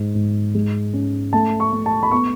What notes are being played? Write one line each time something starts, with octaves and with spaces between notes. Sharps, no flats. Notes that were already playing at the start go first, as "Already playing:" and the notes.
Already playing: G#2
G#2
G#3
C#4
A3 A5
C#6
A3
A5
B5
B3 C#6